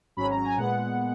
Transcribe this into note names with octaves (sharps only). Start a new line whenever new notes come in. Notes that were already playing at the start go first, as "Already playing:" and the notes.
G#1 G#2 F#3 C#4 B5
A#5
G#5
A#2 G#3 B3 F#5